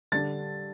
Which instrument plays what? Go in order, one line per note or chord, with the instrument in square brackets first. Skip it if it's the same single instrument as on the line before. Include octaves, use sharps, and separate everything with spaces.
[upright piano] D3 G3 D4 A6